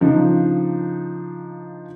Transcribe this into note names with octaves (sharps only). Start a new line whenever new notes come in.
C#3 F3 D4 D#4